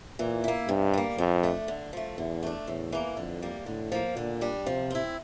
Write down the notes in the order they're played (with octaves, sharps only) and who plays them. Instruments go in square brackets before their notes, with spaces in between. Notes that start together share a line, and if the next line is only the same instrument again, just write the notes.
[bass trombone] A#2 [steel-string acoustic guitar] E3
[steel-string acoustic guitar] A#3 E4
[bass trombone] G2 [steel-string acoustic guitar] C3
[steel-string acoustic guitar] G3 A#3
[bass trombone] F2 [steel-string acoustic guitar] F3
[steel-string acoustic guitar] A3 D4
D3
F3 A3
[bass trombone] E2 [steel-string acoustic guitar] D3
[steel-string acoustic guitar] A3 D4
[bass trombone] E2 [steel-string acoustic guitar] A2
[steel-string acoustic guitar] E3 A#3
[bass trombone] F2 [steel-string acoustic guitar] D3
[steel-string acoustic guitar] G3 A#3
[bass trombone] A2 [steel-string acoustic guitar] D3
[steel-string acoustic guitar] F3 A#3
[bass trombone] A#2 [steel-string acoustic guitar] D3
[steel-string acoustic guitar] G3 D4
[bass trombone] C3 [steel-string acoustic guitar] F3
[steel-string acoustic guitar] C4 E4